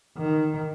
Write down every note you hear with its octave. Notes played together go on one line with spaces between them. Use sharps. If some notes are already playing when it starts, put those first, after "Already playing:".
D#3